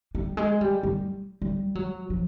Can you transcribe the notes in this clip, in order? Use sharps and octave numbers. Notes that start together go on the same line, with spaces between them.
G3
G#3
G3
G3
G3
F#3
F3